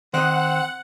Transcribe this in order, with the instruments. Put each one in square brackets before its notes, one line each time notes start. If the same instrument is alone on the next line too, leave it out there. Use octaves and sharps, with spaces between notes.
[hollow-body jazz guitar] D#3 D#5 [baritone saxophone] C4 [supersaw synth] F#5 [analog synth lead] F#6